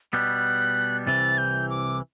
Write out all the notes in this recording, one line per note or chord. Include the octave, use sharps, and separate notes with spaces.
B2 G3 B3 F#6
C2 C3 E3 A6
G6
D6